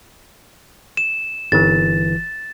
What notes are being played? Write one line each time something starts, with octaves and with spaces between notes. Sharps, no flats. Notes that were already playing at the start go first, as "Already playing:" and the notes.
E7
G1 E3 A6